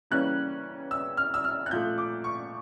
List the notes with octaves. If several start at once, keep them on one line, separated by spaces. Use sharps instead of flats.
C#3 E3 G3 A#3 C#4 F#6
E6
F6
E6
F6
F#6
A#2 F3 A3 G6
D6
C#6